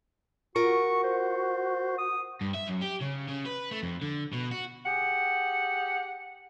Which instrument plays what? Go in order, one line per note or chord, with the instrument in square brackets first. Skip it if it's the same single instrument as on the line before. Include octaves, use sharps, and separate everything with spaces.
[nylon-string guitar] F4 A#4 [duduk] F#4 [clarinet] C#6
[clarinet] C5
D#6
[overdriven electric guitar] G2
E5
F#2
G4
C#3
C#3
B4
A3
F2
D3
B2
F#4
[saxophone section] G4 G#4 F#5